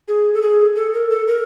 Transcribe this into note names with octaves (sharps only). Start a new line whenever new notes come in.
G#4
A4
G#4
A4
A#4
A4
A#4